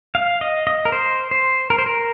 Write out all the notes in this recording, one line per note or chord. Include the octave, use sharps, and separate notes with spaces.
F5
D#5
D#5
A#4
C5
C5
A#4
C5
A#4